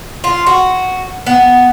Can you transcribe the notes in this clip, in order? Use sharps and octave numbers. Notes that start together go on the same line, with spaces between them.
F4
F#4
B3